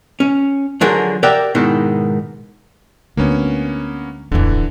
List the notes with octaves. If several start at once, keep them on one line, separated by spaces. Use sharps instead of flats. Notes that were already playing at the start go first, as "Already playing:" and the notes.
C#4
D3 F3 F#3 G#4 A#4
G4 A#4 D5 E5 F#5 G5
G#2 B2 D#3 E4
D2 G#3 A#3 B3 C#4
D1 A1 F2 D3 E3